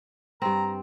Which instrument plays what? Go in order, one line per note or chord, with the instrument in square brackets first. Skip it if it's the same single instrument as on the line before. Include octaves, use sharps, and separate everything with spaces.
[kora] G2 C4 [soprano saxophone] A#5